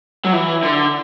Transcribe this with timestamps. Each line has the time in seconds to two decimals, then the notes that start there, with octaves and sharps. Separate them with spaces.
0.25 F#3
0.33 E3
0.63 D3